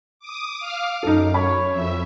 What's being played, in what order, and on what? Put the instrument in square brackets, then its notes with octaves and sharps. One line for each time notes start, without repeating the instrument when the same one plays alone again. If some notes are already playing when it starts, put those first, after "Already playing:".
[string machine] D6 D#6
F5 D6 F6
[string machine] F#2 [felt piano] D#4 A4
[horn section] C#5 [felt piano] B5
[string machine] F2 E5